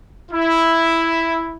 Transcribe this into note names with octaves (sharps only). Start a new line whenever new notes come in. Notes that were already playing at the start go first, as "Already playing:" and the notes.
E4